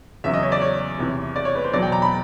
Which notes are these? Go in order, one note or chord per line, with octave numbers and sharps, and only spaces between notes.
E2 C#3 F#3 E5
D#5
C#5
D5
C#5
E2 C3 E3
D5
C#5
B4
C5
E2 B2 F#3 D5
G5
A#5
B5